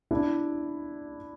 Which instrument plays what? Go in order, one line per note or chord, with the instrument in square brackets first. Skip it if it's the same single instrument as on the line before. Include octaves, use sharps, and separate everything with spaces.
[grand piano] D4 E4